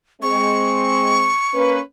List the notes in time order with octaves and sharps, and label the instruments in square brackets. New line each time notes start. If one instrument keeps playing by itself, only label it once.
[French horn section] G#3 C4 [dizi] C#6
[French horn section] A#3 C#4 B4